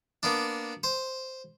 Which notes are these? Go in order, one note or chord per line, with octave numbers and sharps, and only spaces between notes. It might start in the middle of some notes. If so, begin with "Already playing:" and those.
A#3 B3 D4
C5